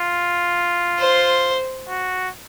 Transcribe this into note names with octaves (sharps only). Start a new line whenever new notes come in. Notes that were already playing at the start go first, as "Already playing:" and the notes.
Already playing: F4
C5
F#4